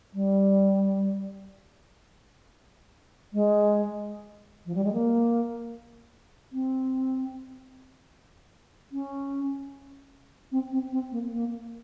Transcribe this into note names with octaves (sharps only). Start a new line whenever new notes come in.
G3
G#3
F3
G3
G#3
A#3
C4
C#4
C4
C4
C4
A#3
A#3